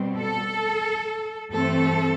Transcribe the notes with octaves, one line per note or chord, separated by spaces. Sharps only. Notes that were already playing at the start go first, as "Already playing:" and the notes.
Already playing: B2 G3 C4
A4
G2 E3 A3 C4 A4